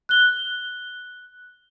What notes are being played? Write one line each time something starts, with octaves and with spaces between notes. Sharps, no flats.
F#6 G7